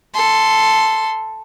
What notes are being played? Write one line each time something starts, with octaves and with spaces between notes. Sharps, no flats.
A4 C6